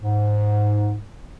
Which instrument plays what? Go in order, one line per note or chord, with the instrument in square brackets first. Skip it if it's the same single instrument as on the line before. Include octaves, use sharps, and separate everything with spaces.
[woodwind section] G#2